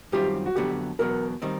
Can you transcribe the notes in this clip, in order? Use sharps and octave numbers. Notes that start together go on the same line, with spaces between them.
F#2 D#3 G3 C4 F4 G4
F#4
F2 D3 F#3 B3 G4
E2 B2 F#3 A#4
D#3 G3 C4 D#4